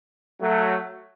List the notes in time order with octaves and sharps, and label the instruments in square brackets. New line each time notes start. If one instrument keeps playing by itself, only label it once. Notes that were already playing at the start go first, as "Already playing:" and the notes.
[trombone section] F#3 A3